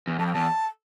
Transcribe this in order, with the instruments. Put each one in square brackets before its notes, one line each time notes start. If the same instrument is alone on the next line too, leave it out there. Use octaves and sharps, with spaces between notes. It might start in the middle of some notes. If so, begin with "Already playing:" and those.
[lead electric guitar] E2
[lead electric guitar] F2 [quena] A5
[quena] G5
[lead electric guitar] E2 [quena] A5